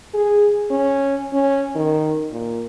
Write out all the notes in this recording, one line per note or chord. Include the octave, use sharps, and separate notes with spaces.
G#4
C#4
C#4
D#3
A#2